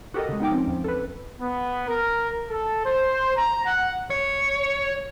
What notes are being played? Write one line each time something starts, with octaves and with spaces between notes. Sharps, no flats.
F#4 G4 A4 A#4 D#5
C#3 G#3
B3 D#4 G5 D6
F3 C4 C#4
E2 F3
A4 B4
B3
A#4
A4
C5
A#5
F#5
C#5